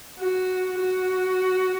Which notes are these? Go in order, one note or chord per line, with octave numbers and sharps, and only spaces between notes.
F#4
F#4